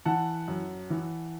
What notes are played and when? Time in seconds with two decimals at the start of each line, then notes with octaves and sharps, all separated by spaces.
0.05 E3 F#5 A5
0.48 F#2
0.90 E3